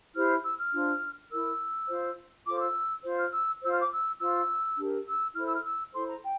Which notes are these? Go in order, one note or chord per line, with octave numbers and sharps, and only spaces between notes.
E4 G4 C5 F6
E6
F6
D4 F4 C5
E4 A#4 E6
F4 C5
F4 A4 C5 D6
E6
F4 C5
F6
E6
F4 C5 E6
F6
D6
E6
F4 C5 E6
D4 G4 A#4
E6
E4 A4 C5 F6
E6
F6
E6
E4 A4 C5 C6
A#5
G5